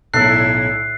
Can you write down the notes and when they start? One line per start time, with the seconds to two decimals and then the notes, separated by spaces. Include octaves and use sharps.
0.14 B1 A2 D3 E4 A4 E5 F#6 C7